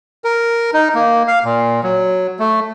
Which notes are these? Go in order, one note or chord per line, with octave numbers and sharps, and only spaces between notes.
A#4
D#4
A#3
F5
A#2
F#3
A3